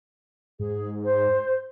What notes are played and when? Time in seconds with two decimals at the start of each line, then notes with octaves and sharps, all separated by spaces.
0.60 G#2 G#4
1.04 C5